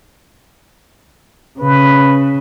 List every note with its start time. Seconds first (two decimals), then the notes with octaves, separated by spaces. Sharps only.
1.59 C#3 B4